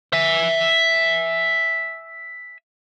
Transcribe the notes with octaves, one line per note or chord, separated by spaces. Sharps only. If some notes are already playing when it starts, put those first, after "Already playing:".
E5 G#5